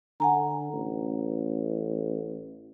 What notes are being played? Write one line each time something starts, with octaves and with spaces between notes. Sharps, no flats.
D3 F#5 G#5 A#5
A1